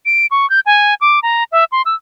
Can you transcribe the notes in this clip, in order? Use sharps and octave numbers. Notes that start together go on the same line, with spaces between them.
D7
C#6
G6
G#5
D6
A#5
E5
C6
E6